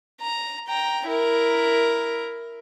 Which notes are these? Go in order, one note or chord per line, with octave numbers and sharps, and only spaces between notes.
A#5
G5 A#5
E4 A#4